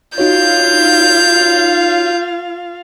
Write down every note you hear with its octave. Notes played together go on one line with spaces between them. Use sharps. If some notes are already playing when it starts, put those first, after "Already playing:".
D#4 F4 F#4 C#5 F5 G6